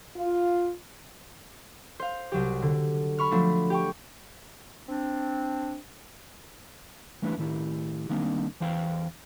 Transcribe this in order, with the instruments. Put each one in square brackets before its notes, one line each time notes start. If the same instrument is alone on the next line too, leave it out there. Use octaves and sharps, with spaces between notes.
[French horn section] F4
[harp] C5 F5
C2 F#3 G4
D3
B5 C#6 F6
F3 F#3 A3 D4
G4 G5 C#6
[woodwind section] C4 D4
[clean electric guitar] E3 G3 A3 D4 E4 B4
A2 D#3 E4 G4
D#3 G3 A#3 C4 D4 D#4
E2 E3 C5 F5 G5